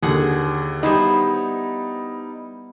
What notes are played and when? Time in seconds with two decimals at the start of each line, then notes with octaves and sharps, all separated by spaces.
0.03 D#2 D3 G#4 F#5
0.83 G3 B3 D#4 E4 C5